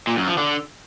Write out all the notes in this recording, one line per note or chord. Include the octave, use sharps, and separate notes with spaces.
A#2
F#2
F3
D3